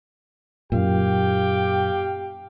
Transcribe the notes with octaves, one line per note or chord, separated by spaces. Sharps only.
F#2 A#2 G4 F5 G5